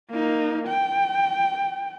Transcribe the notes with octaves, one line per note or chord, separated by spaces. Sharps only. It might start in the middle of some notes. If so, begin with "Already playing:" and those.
A#3 D#4
G5